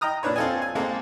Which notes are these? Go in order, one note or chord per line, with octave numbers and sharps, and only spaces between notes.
D#5 G5 A#5 D#6 F6
A#2 D4 B4 C#5
C4 F4 A4 D#5 G#5
G#5
G#3 A#3 C4 A4